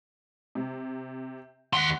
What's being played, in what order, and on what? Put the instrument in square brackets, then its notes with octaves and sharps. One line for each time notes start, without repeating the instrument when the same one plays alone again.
[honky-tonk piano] C3
[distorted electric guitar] D#2 C6 [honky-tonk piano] F#5 F#6